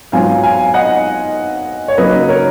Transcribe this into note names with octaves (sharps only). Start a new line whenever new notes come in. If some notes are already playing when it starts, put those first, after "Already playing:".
G#2 F#3 B3 F4 F5 G#5
F5 G#5
D#5 F#5
C#5
C#3 F#3 A#3 D#4 B4 D#5
A#4 C#5